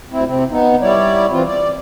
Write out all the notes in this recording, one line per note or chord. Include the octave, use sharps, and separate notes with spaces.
D2 C4 E4
C3 C4
B3 D#4
G3 E4 C#5 D5
E3 C4 F4
D5